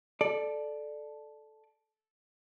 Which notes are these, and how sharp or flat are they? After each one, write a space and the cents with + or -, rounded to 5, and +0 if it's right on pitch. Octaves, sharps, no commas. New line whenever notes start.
A4 -10 D5 +15